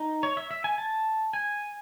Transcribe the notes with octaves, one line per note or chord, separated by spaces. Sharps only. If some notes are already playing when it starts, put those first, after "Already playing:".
Already playing: D#4
C#5
E5
E5
G#5
A5
G#5